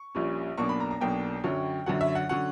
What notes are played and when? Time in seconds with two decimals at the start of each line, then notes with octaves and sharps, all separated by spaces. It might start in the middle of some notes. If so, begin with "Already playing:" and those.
Already playing: C#6
0.15 A#1 A#2 G3 C#4
0.58 B1 B2 A#3 D4 C#6
0.69 B5
0.80 A#5
0.91 A#5
1.01 B1 B2 A#3 D4 G5
1.44 F#2 D3 F#3 C#4
1.86 F#2 D3 F#3 C#4 F#5
2.01 E5
2.15 F#5
2.29 D3 F#3 C#4 F#5